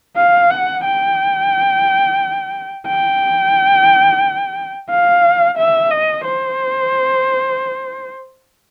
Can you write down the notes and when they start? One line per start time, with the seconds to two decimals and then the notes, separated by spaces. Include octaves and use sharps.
0.17 F5
0.50 F#5
0.85 G5
2.87 G5
4.90 F5
5.58 E5
5.91 D#5
6.26 C5